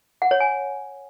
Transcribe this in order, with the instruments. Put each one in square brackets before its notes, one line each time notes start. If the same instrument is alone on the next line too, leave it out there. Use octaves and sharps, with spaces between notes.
[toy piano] F#5
C#5
G#5